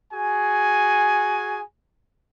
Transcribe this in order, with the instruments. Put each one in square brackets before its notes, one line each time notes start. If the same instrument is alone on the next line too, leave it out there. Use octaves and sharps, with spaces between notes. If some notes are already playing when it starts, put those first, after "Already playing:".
[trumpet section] F#4 G#4 G#5